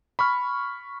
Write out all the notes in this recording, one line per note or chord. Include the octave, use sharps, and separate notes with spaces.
B5 C#6 F6